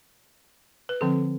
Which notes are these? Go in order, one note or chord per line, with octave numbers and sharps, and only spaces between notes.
B4
D3 F3 C4 A4